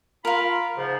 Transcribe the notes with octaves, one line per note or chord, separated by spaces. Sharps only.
F4 A#4 F5 B5
G#2 C#3 F3